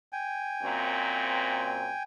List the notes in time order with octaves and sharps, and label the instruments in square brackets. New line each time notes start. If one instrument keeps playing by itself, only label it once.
[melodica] G5 G#5
[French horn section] F#2 A#2 C4